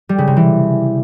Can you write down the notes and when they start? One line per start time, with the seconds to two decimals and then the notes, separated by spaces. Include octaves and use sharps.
0.09 G3
0.18 C#3
0.28 C3
0.37 E3